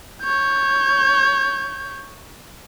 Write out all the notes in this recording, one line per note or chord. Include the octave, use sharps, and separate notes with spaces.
C#5 G6